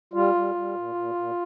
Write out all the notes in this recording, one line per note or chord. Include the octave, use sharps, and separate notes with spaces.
G3 F4
G3
G3
A#2
A#2
A#2